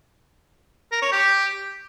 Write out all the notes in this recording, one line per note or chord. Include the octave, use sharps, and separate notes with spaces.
A#4
C#5
G4